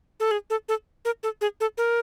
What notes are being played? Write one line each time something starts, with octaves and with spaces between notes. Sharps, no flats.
A4
G#4
A4
A4
A#4
A4
G#4
A4
A#4